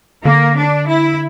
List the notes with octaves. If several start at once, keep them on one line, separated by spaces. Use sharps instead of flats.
D3 A#3
D4
E4